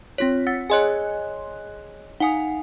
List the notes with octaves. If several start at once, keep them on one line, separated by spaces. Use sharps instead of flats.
C4 F4 C#5 A#6 B6
F#5 E6 A6 C#7
G#4 C#5 D#5 G#5 C6 F#6
D#4 F5 F#5 G#5 D#6